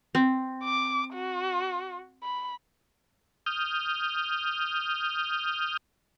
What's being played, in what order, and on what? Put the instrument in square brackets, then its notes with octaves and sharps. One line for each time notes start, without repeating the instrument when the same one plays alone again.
[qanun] C4
[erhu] D6
F#4
B5
[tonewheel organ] D#6 F6 G6